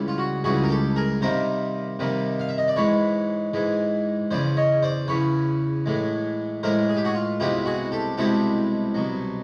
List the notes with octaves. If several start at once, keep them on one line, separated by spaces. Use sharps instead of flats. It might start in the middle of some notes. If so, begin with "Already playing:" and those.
Already playing: C#2 C#3 E3 G3
F4
F#4
C#2 C#3 E3 G3 F#4 G#4
A#4
G4 A4
G#4 A#4
C3 D#3 G3 A#3 A#4 C5
C3 D#3 G3 A#3
F5
E5
D#5
D5
G#2 E3 G#3 B4 C#5
G#2 E3 G#3
E2 C#3 E3 C5 D5
C#5 D#5
C5 D5
E2 C#3 E3 B4 C#5
A2 E3 G#3
A2 E3 G#3 A#4 C5
G#4
G4
F#4 G#4
F4
C2 B2 G#3 C4 E4 F4 G4
F#4 G#4
G4 A4
C2 B2 G#3 C4 E4 G4 A4
C2 B2 F#3